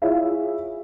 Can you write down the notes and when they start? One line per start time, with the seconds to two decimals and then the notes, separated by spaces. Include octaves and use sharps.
0.02 E4 F4 G#4 C#5 E5 F5